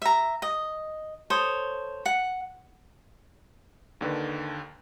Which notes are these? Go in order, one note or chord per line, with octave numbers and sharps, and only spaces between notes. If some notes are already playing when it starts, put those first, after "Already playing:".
E5 A#5
D#5
A4 C5 C#5 D#6
F#5
D#2 D3 D#3 B4